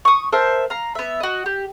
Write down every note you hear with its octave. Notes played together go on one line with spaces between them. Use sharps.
C#6 D#6
A#4 C5 E5 A5
F5 A#5
B3 E5
F#4 D#5
G4